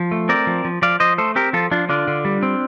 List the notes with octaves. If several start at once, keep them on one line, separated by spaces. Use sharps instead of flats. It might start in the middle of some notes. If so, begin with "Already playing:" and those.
Already playing: F3
A3
C4 A#4 D5
F3
F3
F3 D5 F5
F3 C5 D#5
A3 A4 C5
C4 G4 A#4
F3 F4 A4
F3 D4 F4
D3 D4 F4
D3
G3
C4